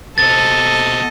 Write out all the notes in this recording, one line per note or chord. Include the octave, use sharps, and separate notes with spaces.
B2 C4 A4 D#5 A6